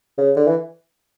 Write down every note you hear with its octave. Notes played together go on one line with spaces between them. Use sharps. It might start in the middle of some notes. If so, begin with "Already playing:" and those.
C#3
D3
E3